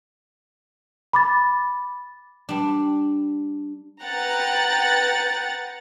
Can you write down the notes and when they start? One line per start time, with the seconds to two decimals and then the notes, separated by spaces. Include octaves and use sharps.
1.13 B5 D6 A6
2.49 G3 D4
4.04 B4 F#5 G5 A#5 F#6 A6